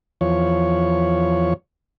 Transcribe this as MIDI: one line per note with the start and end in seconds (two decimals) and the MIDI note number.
0.21 1.54 40
0.21 1.54 53
0.21 1.54 73